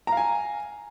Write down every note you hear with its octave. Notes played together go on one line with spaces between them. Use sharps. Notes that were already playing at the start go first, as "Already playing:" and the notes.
F5 G#5 A#5